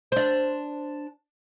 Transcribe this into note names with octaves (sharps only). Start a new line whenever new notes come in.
D4 C5